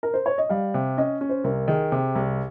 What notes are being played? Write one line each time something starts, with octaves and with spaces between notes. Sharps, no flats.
A#4
C5
C#5
D#5
G3 F5
C3
C#4 D#5
C#4
C5
C2 A#4
D#3 G#4
C3
C2